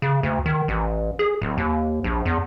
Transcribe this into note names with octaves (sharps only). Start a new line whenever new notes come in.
C#3
D2
D#3
A1
G#4
D1
D#2
A#1
E2